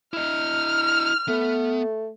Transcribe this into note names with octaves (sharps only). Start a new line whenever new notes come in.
E4 D#5 F6
A3 B3